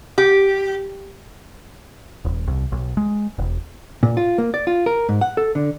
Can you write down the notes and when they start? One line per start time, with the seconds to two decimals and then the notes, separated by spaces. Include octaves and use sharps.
0.18 G4
2.25 D#1
2.47 C2
2.72 B1
2.97 G#3
3.38 E1
4.03 A#2
4.17 F4
4.38 A#3
4.54 D5
4.67 F4
4.86 A#4
5.09 G#2
5.21 F#5
5.37 A4
5.55 D3